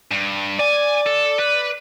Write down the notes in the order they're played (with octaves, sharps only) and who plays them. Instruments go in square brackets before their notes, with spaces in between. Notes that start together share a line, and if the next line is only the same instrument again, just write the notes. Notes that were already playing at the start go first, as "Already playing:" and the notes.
[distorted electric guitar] G2
[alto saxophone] D5 [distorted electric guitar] G#5
[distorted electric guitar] A4
B4